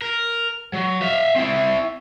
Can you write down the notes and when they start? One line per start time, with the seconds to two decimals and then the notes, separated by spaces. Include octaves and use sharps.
0.02 A#4
0.73 F#3
1.02 E5 F5
1.36 C4 E4